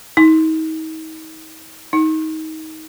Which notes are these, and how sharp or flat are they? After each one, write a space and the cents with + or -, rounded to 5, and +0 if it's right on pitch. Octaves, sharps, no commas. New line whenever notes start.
D#4 +40
D#4 +25